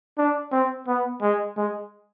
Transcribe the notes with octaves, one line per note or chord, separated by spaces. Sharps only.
D4
C4
B3
G#3
G#3